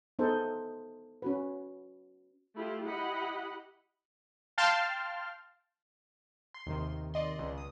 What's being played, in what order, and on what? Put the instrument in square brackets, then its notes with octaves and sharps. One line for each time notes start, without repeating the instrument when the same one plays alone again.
[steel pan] B3 D#4 G#4 A4 C5
C#4 F#4 B4
[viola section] A3 E4 F4 G4
E4 G4 D#5 F#5 B5
[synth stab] F5 G5 A5 C6 F6
C6
[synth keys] D#2 C3 D#3
[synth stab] D5 D#5 C6
[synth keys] C#2
[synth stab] D#6